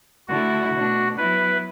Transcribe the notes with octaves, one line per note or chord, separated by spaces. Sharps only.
D3 A3 E4 F#4
B2 A3 D4
F#3 B3 E4 B4